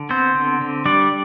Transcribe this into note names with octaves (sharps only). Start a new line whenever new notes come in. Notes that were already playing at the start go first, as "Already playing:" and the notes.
Already playing: D3
B3 C4 C5
D3
D3
G3 D4 D5